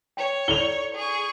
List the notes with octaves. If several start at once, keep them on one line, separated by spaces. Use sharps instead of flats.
C#5 G5
E4 A4 D5 F7 G7
G#4 C#6